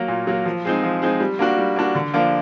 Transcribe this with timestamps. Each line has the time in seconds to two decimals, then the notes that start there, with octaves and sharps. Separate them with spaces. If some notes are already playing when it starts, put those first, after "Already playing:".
Already playing: F#3 A#3
0.08 A#2
0.27 F#3 A#3
0.46 F3
0.65 G#3 C4 D#4
0.83 F3
1.02 G#3 C4 D#4
1.20 G3
1.39 A#3 D4 F#4
1.58 G3
1.76 A#3 D4 F#4
1.95 D3
2.14 F3 A#3 D4